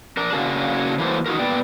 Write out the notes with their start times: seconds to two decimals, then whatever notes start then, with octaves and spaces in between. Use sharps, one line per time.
0.17 D4 A#4
0.33 C#3 F#3 A#3 D4 F#4 G#4
0.99 E3 F#3 A3 A#3 B4 C5
1.26 D#4 F4 F#4 A#4
1.39 A#2 B3 D5 G5